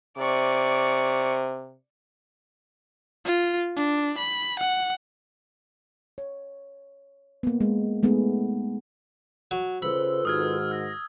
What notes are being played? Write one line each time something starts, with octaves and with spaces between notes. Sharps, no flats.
C3 D5 C#6
F4
D4
B5
F#5
C#5
A#3 B3
G#3
G#3 A3 B3 D#4 G#4
F#3
C#3 F4 A4 B4 C5 B5 E6
G#2 D#3 F#4 D#6 F6 G#6
F6 A#6